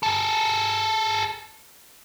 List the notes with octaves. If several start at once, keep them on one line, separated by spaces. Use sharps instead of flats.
G#4 A4